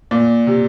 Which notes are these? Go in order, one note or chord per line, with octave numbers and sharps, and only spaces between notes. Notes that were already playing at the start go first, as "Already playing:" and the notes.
A#2
C3